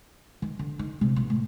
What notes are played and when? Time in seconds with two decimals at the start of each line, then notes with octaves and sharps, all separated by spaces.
0.42 D#3
0.59 D3
0.79 D#4
1.01 C3
1.16 B1
1.30 A2